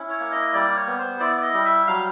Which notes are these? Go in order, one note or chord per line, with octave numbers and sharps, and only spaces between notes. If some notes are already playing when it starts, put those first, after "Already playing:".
Already playing: C#4 E4
C#5
A#3
D#5
G3 D5
C#5
B3
C5
E4 D5
D5
D#5
G3
E5
F#3 F5